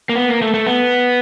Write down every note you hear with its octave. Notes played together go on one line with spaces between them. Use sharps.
A#3
B3
A#3
A3
A3
B3